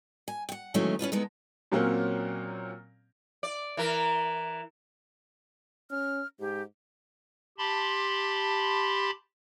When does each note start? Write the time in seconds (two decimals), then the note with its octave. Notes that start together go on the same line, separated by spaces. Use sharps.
0.28 G#5
0.49 F#5 G5
0.74 D#3 E3 F#3 G#3 A3 C#4
0.99 C#4 D4 F4 B4
1.12 G#3 B3 D#4 A4
1.72 A#2 F#3 A#3 C4 C#4
3.43 D5
3.77 E3 A#4
5.91 C#4 F6
6.40 G#2 G4
7.58 G4 A5 B5 C6